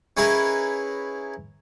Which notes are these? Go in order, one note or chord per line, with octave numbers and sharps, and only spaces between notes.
C#4 D#4 E4 G#4 A#4 B4